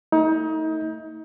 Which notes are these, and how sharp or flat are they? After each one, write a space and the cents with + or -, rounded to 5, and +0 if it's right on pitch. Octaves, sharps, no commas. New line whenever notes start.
A3 +35 D#4 +30